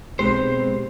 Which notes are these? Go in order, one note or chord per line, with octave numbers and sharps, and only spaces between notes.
B1 G#3 C4 G4 B4 C5